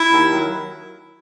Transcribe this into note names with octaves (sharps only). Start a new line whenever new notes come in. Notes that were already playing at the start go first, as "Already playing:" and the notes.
Already playing: E4
D#2
D#3 F#3